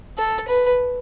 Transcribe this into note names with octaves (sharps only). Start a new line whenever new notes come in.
A4
B4